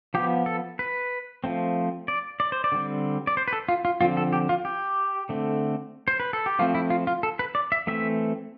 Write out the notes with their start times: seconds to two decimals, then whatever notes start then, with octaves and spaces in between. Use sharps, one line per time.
0.14 F3 B3 G4
0.46 A4
0.79 B4
1.44 F3 A3 C4
2.08 D5
2.40 D5
2.52 C5
2.64 D5
2.72 D3 G3 C4
3.27 D5
3.37 C5
3.48 B4
3.53 A4
3.69 F4
3.85 F4
4.01 D3 F3 C4 F4
4.17 A4
4.33 G4
4.49 F4
4.65 G4
5.29 D3 A3 C4
6.08 C5
6.20 B4
6.33 A4
6.46 G4
6.59 F3 A3 C4 F4
6.75 E4
6.90 F4
7.07 F4
7.23 A4
7.39 B4
7.55 D5
7.72 E5
7.87 E3 A3 C4 E5